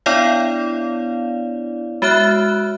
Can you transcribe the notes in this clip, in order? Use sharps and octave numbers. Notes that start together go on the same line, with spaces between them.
B3 D4 E4 C#5 D5 F5
G#3 F#4 C#5 E5 F6 F#6